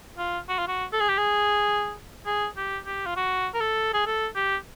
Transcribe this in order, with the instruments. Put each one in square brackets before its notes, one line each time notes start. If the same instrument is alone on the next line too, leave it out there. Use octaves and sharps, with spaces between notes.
[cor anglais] F4
F#4
F4
F#4
A4
G#4
G4
G#4
G#4
G4
G4
F4
F#4
A#4
A4
G#4
A4
G4